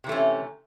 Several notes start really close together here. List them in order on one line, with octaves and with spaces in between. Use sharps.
C3 E3 A3 C#4